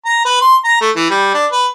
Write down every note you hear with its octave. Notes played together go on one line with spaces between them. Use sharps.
A#5
B4
C6
A#5
A3
E3
G3
D4
B4